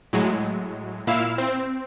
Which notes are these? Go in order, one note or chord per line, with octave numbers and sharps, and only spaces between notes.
A2 F#3 G#3
A#2 E4 F5 E6
C4